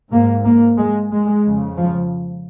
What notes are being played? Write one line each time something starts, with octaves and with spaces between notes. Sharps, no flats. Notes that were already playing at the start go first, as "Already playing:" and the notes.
G#2 A#3
A#3
G#3
G#3
F2 C#3
F3